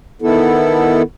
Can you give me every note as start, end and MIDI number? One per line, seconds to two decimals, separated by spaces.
0.22 1.02 51
0.22 1.02 59
0.22 1.02 64
0.22 1.02 69